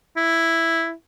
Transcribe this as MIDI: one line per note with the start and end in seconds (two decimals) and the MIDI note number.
0.17 0.92 64